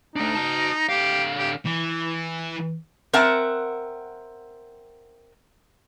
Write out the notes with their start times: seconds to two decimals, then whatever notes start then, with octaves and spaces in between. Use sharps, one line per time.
0.16 A3 D4 D#4
0.35 F#4 A5
0.89 D3 G4 F5
1.39 G4
1.66 E3
3.13 C4 A#4 E5 F#5 A5